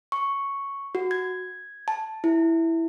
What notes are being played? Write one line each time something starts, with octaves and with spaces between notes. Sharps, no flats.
C#6
F#4
G#6
A5
E4